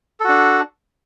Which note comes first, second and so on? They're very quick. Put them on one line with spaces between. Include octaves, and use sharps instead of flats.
A4 F#4 D4